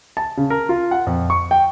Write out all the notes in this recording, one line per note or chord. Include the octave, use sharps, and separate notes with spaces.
A5
C#3
A#4
F4
F#5
F2
C#6
G5